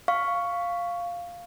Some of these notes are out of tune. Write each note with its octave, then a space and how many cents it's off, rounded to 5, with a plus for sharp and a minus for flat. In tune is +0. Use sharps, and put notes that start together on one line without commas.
F5 +0 C#6 +5